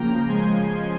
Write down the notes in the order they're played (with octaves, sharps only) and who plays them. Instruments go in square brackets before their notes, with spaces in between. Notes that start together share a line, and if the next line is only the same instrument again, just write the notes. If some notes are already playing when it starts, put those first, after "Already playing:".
Already playing: [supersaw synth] C#3 F3 A#3 G5 A#5
C#3 F3 G#3 G#5 C6